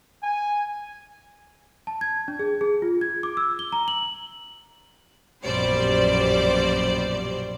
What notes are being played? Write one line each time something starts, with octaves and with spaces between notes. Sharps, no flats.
G#5
A5
G#6
D4
G#4
G#4
F4
G#6
D6
E6
G7
A#5
F#7
A#1 F#2 B2 G3 C5 D5